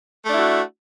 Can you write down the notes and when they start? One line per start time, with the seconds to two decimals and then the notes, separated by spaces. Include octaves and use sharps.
0.24 A3
0.28 D4
0.32 E4
0.36 F#4